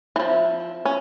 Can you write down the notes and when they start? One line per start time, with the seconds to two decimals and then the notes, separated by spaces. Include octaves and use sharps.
0.16 E3 F3 C4 E4 E5
0.60 E5
0.85 C#4